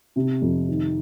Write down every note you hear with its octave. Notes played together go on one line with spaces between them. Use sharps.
C3
F2
D#3